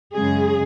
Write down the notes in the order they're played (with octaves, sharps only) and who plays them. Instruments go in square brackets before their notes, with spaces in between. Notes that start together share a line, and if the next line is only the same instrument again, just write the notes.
[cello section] F#2 C#3 G#3 G#4